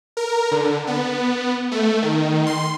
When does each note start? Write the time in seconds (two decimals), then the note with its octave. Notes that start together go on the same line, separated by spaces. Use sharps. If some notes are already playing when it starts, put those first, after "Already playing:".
0.17 A#4
0.51 D3
0.87 B3
1.72 A3
2.02 D#3
2.46 C6